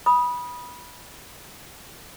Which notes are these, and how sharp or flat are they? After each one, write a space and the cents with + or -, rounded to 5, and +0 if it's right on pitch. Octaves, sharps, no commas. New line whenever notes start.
B5 -20 D#6 +0